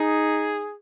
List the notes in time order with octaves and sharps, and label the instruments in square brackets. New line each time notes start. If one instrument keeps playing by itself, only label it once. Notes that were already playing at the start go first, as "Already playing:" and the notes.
Already playing: [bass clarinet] D#4 [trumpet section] G#4